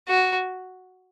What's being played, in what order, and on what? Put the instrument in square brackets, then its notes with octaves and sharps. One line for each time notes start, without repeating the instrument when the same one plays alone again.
[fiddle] F#4